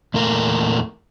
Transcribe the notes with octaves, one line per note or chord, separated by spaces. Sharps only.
E2 A#2 E3 A3 A#4